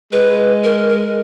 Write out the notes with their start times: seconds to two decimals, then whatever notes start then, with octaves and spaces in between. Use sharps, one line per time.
0.12 G#3 B4
0.64 A#4
0.89 A#4